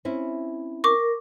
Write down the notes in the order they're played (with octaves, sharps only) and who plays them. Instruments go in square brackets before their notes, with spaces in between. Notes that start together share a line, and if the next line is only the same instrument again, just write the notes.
[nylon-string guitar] C4 C#4 E4
[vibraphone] A#4 [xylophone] C#6 D6